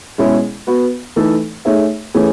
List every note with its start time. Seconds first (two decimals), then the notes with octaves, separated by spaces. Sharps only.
0.18 B2 G#3 C#4 E4 G#4
0.67 B3 F#4 B4
1.16 E3 A3 D#4 A4
1.65 A3 D#4 G#4 C#5 E5
2.14 E3 A3 C#4 G#4